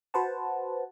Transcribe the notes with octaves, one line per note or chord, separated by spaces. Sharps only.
F#4 B4 C5 F#5 A5